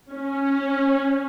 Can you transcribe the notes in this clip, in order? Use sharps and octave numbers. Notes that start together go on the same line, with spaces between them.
C#4